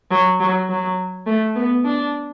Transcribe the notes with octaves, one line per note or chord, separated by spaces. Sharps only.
F#3
F#3
F#3
A3
B3
D4